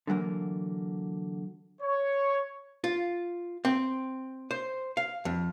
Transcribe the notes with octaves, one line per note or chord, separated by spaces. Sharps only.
D3 E3 F#3 A#3
C#5
F4
C4
C5
F5
F2